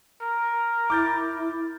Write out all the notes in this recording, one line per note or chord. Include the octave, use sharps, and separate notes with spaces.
A#4
E4 D6 G6 A6